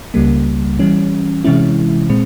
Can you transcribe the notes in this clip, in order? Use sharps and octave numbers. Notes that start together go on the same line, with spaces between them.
C#2 C#3 G3 A#3
E3 G3 C#4
C3 E3 G#3 C#4 E4
A#2 G#3 C4